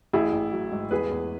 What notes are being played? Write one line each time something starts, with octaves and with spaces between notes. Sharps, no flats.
A1 E4 G#4
A1
F#3
G#2
E2 G#4 B4
E2